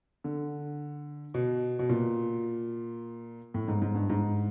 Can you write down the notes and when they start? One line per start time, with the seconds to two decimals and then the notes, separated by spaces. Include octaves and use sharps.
0.24 D3
1.34 B2
1.79 B2
1.90 A#2
3.54 A2
3.68 G#2
3.82 G#2
3.95 G2
4.10 G#2